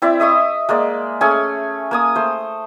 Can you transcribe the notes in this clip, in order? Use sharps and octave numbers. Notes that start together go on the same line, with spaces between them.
C4 E4 D5 E5
D#5 E5 C#6 D#6
G#3 A#3 D5
A3 C#4 G#4 G#5
A#3 G#5 D#6
A3 C5